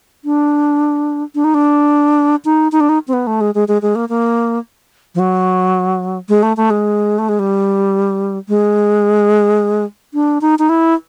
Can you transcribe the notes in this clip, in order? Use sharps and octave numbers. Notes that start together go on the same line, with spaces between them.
D4
D4
D#4
D4
D#4
D#4
D4
D#4
C4
B3
A3
G#3
G#3
G#3
G#3
A#3
A#3
F3
F#3
G#3
A3
A3
G#3
A3
G#3
G3
G#3
D4
D#4
D#4
E4